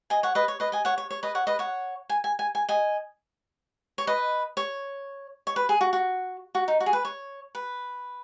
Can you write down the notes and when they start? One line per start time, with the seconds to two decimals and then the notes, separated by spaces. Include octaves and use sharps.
0.10 D#5 G#5
0.23 C#5 F#5
0.35 B4 D#5
0.48 C#5
0.60 B4 D#5
0.72 D#5 G#5
0.85 C#5 F#5
0.98 C#5
1.10 C#5
1.23 B4 D#5
1.35 C#5 F#5
1.47 B4 D#5
1.59 C#5 F#5
2.09 G#5
2.24 G#5
2.39 G#5
2.55 G#5
2.69 D#5 G#5
3.98 C#5
4.07 B4 D#5
4.57 C#5
5.47 C#5
5.56 B4
5.69 G#4
5.81 F#4
5.93 F#4
6.55 F#4
6.68 D#4
6.80 F#4
6.86 G#4
6.93 B4
7.05 C#5
7.55 B4